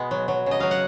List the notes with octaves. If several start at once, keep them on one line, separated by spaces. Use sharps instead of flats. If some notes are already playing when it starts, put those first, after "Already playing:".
Already playing: B2 G#3 B3
F#3
F#3
C#3 D#5
F#3 F5
F#5